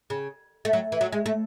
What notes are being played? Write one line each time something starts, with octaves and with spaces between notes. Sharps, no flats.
C#3
A3
F#3
E3
F#3
G#3
A3